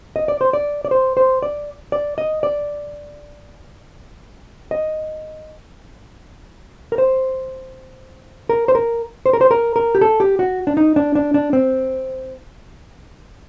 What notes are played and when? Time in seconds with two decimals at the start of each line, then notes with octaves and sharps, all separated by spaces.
0.16 D#5
0.28 D5
0.41 C5
0.53 D5
0.85 D5
0.91 C5
1.17 C5
1.43 D5
1.92 D5
2.18 D#5
2.43 D5
4.71 D#5
6.92 A#4
6.98 C5
8.49 A#4
8.68 C5
8.75 A#4
9.26 C5
9.33 A#4
9.41 C5
9.51 A#4
9.76 A#4
9.95 G4
10.01 A4
10.20 G4
10.39 F#4
10.67 D4
10.77 D#4
10.96 D4
11.15 D4
11.34 D4
11.53 C4